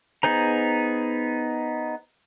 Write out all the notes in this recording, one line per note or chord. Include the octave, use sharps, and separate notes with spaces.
B3 D#4 G#4 C5 A#5